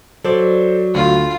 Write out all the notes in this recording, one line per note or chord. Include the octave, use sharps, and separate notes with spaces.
F#3 A4 C5 D5
D2 F4